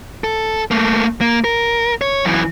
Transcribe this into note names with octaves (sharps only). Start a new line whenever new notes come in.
A4
A3 A#3
A#3
A#4
C#5
F#2 E3